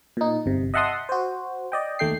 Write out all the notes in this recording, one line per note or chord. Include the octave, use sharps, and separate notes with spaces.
A#2 D#4
G1 C3
D#5 E5 F#5 A5 C6 D#6
F#4 C5
D5 D#5 G5
D#2 A3 G5 C7